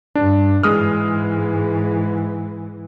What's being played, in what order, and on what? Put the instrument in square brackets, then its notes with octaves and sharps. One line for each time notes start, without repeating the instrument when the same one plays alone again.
[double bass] G2 [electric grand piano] D4
[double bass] G#2 E3 [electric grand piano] G#3 D#6 F6